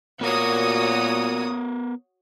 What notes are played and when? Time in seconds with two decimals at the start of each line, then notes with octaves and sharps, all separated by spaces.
0.21 A#2 B3 F#4 A#4 C#5 D#6